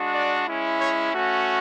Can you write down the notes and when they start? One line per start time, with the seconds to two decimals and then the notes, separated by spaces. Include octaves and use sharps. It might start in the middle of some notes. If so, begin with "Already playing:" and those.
Already playing: G#3 D4 F#4
0.14 D5
0.47 G#3 C#4 E4
0.81 C#5
1.13 A3 C#4 F#4